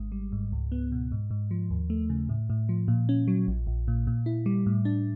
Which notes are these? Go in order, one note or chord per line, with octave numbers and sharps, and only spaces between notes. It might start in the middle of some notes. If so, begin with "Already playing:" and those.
Already playing: G#1 G#3
G3
G#2
C#2
B3
B2
G#2
G#2
F3
D#2
A3
C#3
A2
A2
F3
A#2
C#4
F#3
A#1
A#1
A#2
A#2
E4
G3
A2
D4